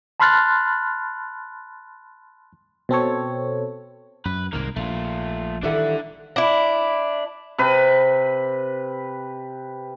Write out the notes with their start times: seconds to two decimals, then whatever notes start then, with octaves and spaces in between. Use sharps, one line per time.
0.20 A5 B5 C6 F6 F#6 A6
2.89 B2 C4 A4 C#5
4.25 F#2 B4
4.53 C2 G#2 D#3 A#3 A#4
4.76 A#1 A3 F4
5.63 D#3 E3 G3 D4 E4 A4 F#5
6.36 D4 E4
7.58 C3 B4